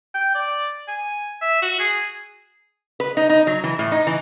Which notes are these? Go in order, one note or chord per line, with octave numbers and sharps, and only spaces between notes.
G5
D5
G#5
E5
F#4
G#4
B4
D#4
D#4
F#3
E3
A2
D#4
E3